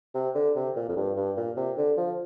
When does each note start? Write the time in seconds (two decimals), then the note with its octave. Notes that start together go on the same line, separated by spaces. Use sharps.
0.15 C3
0.35 D3
0.56 C3
0.76 A#2
0.89 F2
0.96 G2
1.17 G2
1.37 A#2
1.57 C3
1.77 D3
1.97 F3